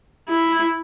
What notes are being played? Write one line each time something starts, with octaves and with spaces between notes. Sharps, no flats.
E4